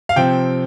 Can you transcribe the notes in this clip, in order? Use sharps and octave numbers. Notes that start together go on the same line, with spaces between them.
F5
C3 F3 C4 G5